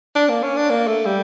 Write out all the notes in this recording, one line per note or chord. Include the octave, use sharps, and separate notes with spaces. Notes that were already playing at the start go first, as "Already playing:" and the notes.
D4
A#3
C#4
D4
A#3
A3
G3